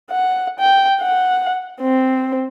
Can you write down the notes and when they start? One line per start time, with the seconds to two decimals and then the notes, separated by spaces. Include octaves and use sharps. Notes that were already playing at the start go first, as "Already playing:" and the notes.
0.11 F#5
0.59 G5
1.01 F#5
1.81 C4